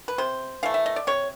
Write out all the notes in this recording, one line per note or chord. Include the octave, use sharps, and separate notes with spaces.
B4
C3 C5
E3 A3 F5
E5
D#5
D5
C3 C#5